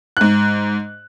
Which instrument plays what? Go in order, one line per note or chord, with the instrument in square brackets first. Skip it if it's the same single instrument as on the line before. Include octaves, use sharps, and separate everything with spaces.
[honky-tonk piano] G#2 F#6